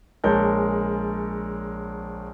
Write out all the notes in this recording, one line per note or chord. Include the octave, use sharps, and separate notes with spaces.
A#1 G#3 A#4 C#5 A5 G6